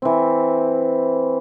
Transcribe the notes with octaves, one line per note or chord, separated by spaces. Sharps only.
E3 C4